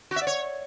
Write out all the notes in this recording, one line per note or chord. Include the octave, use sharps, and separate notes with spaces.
F#4
E5
D5
C#5